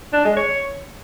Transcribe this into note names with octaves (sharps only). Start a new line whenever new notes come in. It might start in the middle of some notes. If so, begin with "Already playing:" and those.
D4
G#3
C#5